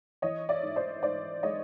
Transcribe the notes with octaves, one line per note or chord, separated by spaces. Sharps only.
E3 C#5 D#5
D5 E5
G#2
C5 D5
G#2 C5 D5
G#3 C#5 D#5